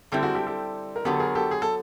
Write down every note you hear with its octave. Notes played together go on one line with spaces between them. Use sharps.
D3 G3 C4 E4 G4 A4
F#4 G#4
G4 A4
G4 A4
A#4
D3 F#3 B3 G4 A4
G#4 A#4
G4 A4
G#4
A4